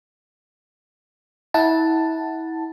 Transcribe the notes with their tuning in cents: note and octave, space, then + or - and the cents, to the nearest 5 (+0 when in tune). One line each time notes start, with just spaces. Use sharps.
E4 -30 F#5 +0 A5 +5